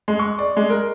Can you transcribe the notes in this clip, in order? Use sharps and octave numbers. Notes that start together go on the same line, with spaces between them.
G#3
C#6
D5
G#3
A#4